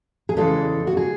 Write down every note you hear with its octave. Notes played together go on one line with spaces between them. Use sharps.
G#4
E2 C#3 E3 G#3 A4
F#4
G#4